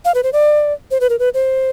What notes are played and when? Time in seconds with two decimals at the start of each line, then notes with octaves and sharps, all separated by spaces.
0.05 F5
0.15 B4
0.23 C5
0.33 D5
0.91 C5
1.01 B4
1.10 A#4
1.19 B4
1.34 C5